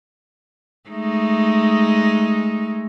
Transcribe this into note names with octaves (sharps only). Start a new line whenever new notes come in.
G#3 A3 D#4